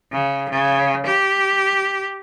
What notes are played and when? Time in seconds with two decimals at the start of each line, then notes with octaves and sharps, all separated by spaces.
0.12 C#3
0.49 C#3
1.06 G4